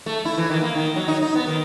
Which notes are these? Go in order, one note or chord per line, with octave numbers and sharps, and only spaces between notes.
A3
E4
E3
D#3
A#3
D#3
F#3
D#4
D#4
B3
D#3